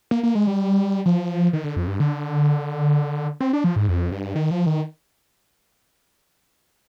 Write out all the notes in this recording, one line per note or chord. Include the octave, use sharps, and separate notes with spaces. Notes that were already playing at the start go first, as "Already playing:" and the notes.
A#3
A#3
G#3
G3
F3
D#3
D3
F2
G2
D3
C4
D4
F3
G#2
F2
G2
D#3
F3
D#3